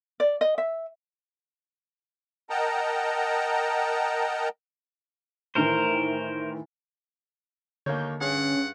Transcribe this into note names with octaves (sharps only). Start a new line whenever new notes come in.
D5
D#5
E5
A#4 D#5 F#5 G5 A5 A#5
A2 D#3 E3 A#4 C5
D#2 D3 A#3 C#5 G6
G2 C#4 G#4 F#5